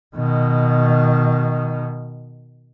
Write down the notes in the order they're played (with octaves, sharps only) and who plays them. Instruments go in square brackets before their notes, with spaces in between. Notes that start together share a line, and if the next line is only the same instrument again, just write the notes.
[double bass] B2 D#3